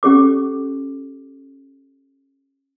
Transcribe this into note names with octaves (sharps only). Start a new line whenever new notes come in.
C#4 G4 A4 D6